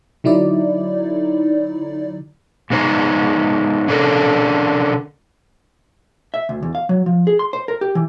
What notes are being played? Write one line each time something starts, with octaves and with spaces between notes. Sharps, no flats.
D3 F#3 D#4 E4 D5
G#2 B3 D#4 C5
D3 C#4 D4 A4 A#4
E5
D2
E2
F5
F#3
F3
G#4
C6
C5
A#4
G4
E3